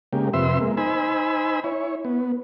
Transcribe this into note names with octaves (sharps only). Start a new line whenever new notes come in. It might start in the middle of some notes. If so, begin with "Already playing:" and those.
C#3 G#3 A#3 G4
F2 C3 B4 E5 C6 E6
G#3 A#3
D#4 C5 G#5 B5 E6
E4 C#5
B3